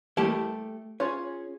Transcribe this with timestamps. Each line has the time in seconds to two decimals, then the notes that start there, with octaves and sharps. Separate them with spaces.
0.17 E3 G3 A3 A#3 G4 A5
1.00 C#4 F4 G#4 C#5